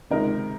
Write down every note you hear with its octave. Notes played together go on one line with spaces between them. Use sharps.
C#2 C3 D#3 A#4